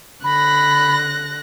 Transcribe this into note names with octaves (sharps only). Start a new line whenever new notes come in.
D3 B5 F#6 A#6